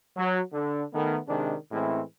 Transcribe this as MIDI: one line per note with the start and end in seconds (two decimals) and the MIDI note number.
0.17 0.40 54
0.53 0.83 50
0.93 1.19 51
0.93 1.19 57
0.93 1.19 59
1.28 1.55 48
1.28 1.55 51
1.28 1.55 56
1.28 1.55 62
1.72 2.01 45
1.72 2.01 52
1.72 2.01 56
1.72 2.01 60
1.72 2.01 61
1.72 2.01 64